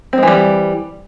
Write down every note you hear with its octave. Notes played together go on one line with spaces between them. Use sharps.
E3 G3 G#3 C4